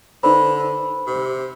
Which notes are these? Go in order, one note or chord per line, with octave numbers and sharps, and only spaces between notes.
D3 D#4 B4 C5 B5
C3